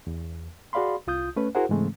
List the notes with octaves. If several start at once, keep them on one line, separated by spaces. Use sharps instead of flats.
E2
F#4 G#4 D5 F5 B5 C6
C2 F4 D#6 G6
A3 C#4 B4
E4 F#4 G#4 A#4 C5 F#5
G#2 C#3 E3 G#3 A3 C4